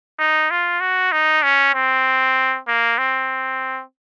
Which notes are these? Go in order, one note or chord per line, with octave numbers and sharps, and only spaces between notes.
D#4
F4
F#4
D#4
C#4
C4
A#3
C4